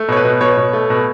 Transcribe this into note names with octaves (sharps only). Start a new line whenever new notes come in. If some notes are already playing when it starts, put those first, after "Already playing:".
Already playing: A3
B2 C#5
B4
B2
B2 C#5
B2
A3
B2